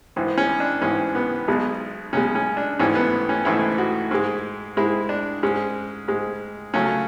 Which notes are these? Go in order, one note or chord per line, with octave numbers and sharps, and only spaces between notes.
G#1 G#2 E3
C#4
D4
G#1 G#2 E3 C#4
B3
B1 B2 G#3
B1 B2 G#3 C#4
C#4
D4
G#1 G#2 E3 A3 C#4
B3
C#4
G#1 G#2 E3 A3 E4
F#4
G#2 G#3
G#2 G#3 E4
D4
G#2 G#3 C#4
G#2 G#3
C#2 C#3 F#3 A3 C#4